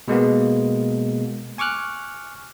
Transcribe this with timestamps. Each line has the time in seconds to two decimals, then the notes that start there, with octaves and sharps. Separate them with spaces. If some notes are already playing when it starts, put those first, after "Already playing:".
0.08 B2 G#3 A#3 B3
1.58 G#5 C#6 D6 F6 F#6